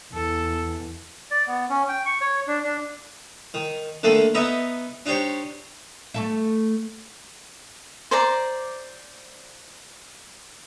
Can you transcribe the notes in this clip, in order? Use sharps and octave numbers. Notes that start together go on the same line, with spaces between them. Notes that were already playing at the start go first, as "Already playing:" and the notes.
E2 A4
D5
B3
C#4
G5
C#6
C#5
D4
D4
D#3
D3 D#3 A3 A#3
B3 D#4 D#5 E5 A#5 B5
D4 D#4 G4 C5 C#5
A3 A4 E5
C5 D5 A#5